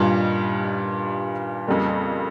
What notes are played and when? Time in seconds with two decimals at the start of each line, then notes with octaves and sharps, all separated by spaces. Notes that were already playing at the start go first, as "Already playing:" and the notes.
Already playing: G2 A#2 D#3 G3 C#4
1.67 F2 C#3 G3 A#3